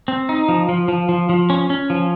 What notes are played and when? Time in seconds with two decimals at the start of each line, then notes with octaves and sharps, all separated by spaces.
0.08 C4
0.29 D#4
0.48 F3
0.69 F3
0.88 F3
1.09 F3
1.29 F3
1.50 C#4
1.70 C#4
1.90 F3